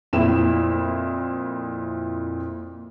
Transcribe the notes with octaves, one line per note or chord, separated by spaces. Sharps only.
F2 A#2 E4 E7